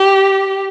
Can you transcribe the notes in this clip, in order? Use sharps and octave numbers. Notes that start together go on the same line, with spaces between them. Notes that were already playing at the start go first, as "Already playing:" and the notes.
Already playing: G4